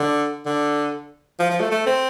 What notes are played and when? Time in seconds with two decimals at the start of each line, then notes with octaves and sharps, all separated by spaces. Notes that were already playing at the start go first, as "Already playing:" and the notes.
Already playing: D3
0.46 D3
1.39 F3
1.50 F3
1.60 A3
1.71 A3
1.86 C4